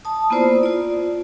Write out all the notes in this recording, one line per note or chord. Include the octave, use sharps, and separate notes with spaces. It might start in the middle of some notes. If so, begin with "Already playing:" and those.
A5 D#6
A#3 B3 E4 F4 C5 D5
F4 D5